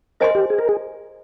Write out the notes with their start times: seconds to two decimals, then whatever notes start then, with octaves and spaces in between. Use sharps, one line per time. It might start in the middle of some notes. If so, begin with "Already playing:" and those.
0.20 A#4 C5 D#5 G#5 C6
0.35 G4
0.50 G#4
0.59 A#4
0.69 G#4